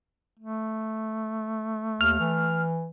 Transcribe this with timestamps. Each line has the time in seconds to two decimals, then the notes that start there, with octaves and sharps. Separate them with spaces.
0.39 A3
2.01 D#2 F6
2.20 E3